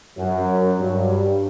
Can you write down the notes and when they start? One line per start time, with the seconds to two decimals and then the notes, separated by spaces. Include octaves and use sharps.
0.18 F#2 F#3
0.80 G2 F#3
1.11 G3